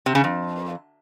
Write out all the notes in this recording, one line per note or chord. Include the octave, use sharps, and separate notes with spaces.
C3
C#3
F2